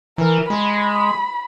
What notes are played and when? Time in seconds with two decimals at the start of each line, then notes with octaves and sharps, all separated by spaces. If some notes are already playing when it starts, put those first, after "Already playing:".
0.18 E3 A#4
0.50 G#3 B5